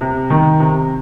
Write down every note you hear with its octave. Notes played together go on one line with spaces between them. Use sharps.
C3
D#3
C3